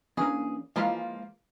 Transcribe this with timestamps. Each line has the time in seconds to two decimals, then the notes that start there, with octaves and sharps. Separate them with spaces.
0.17 E3 A#3 C#4 D4 G#4
0.76 E3 F3 G#3 A#3 F4 F5 B5